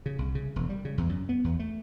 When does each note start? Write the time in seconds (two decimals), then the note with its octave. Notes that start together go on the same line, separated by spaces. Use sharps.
0.06 C#3
0.19 C2
0.35 C#3
0.56 E1
0.69 G3
0.85 C#3
0.98 E2
1.09 F#2
1.29 B3
1.44 E2
1.59 A3